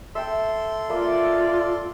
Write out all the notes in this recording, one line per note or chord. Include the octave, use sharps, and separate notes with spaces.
A4 E5 G5 C6
A#3 F4 D5 E5